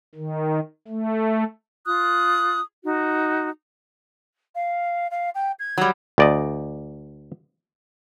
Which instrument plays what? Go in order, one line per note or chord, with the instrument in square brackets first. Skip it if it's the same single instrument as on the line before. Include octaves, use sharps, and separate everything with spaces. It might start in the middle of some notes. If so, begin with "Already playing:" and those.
[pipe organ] D#3
A3
[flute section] F4 D#6 F#6
D#4 F#4
[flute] F5
F5
G5
G#6
[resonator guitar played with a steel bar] F#3 G3
[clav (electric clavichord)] D2 D5 D#5